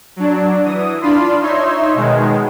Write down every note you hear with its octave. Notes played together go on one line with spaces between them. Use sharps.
F#3 D4
E3 D#6
D4 F4 B5 C6
D#4 C#5 E5 C6
B2 D#3 G#3